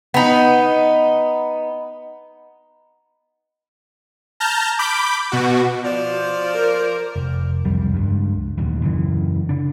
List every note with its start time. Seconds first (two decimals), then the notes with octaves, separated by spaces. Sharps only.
0.14 B3 D#4
4.40 A5 A#5 F6 G6
4.79 B5 D6 G6
5.32 B2 F#4
5.84 F3 C5 D5
6.54 A#4
7.16 F1
7.65 F#1 C2 F2 G3
7.94 C#2 G2
8.58 D#1 A1 D#2
8.82 F#2 C#3 E3
9.49 C#3 D4